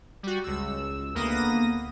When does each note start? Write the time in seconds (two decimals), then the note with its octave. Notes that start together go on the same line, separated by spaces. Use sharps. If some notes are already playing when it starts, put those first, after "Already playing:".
0.23 G3 F#4
0.44 C#2 E6
1.15 D2 A#3 B3 D#6 A#6